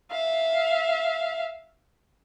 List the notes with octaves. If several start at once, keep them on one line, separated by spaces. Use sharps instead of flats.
E5 F5